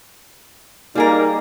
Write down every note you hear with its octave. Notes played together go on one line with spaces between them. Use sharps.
G3 A#3 D#4 G#4 A#4